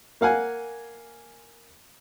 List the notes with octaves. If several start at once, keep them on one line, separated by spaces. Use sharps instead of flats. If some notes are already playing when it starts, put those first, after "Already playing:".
A#3 F5 F#5 G#5